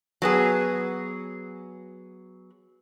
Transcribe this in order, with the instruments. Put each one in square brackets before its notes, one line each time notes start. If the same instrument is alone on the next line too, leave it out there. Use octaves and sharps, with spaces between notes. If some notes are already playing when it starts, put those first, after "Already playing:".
[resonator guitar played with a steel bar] F#3 B3 G#4